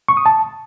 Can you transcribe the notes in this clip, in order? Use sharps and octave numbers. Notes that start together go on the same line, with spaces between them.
C#6
D#6
A5